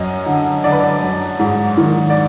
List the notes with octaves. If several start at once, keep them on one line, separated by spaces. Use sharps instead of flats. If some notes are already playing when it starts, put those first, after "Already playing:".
Already playing: F#2 D#5
D3
D3 D5
B4
D5
F#2
G#2
D#3
D5